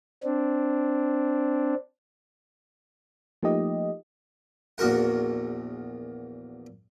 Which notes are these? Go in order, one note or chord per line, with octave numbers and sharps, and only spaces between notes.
C4 D4
F3 A3 A#3 D#4 G4 D#5
A#1 E2 F#4 A#4 F#5